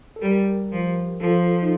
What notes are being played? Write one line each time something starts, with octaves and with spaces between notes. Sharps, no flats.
A4
G3 G4 A#4
F3
F3 F4 A4
D#4